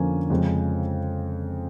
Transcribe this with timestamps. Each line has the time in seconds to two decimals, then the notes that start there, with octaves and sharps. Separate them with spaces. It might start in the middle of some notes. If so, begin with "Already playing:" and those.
Already playing: F2 D3 F3 A#3 C#4 G#5
0.30 F2 C#3 F3 G#3